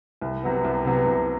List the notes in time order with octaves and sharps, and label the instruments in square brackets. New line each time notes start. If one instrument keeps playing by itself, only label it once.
[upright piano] C2
C3 F#3 B3
C2
C3 F#3 B3
C2